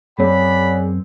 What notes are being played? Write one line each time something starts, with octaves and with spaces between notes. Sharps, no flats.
F#2 C4 G#4 C#5 D5 F#5 B5